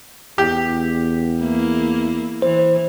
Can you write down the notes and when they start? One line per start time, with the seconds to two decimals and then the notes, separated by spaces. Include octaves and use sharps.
0.38 E2 G4
1.40 A#3 E4
2.42 E3 C5